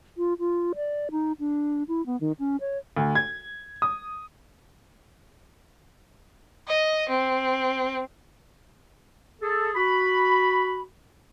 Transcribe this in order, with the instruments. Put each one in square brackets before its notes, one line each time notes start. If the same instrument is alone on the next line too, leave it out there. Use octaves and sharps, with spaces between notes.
[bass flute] F4
F4
D5
D#4
D4
E4
B3
D#3
C#4
C#5
[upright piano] D2
G#6
D#6
[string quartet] D#5
C4
[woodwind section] G#4 A4
F#4 B5